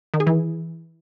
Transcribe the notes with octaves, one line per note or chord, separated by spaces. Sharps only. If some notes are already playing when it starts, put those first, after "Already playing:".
D#3
G#4
E3